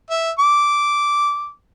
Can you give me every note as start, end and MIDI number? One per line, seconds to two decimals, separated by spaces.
0.10 0.31 76
0.39 1.51 86